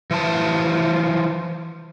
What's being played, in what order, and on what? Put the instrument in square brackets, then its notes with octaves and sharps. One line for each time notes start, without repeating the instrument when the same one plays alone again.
[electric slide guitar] E3 F3 A5